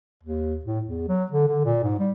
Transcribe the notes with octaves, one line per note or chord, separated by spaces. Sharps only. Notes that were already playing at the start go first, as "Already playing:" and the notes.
D#2
A2
E2
F#3
D3
D3
A#2
G#2
G3